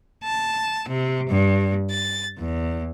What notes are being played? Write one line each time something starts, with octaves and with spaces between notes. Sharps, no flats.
A5
C3
G2
A6
E2